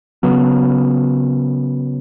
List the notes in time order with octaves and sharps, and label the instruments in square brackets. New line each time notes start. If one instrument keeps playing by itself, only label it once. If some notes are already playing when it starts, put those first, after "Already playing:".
[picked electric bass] C#3 F#3 B3